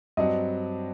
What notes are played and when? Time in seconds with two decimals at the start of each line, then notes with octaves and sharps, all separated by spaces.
0.17 G2 F#3 C4 D#5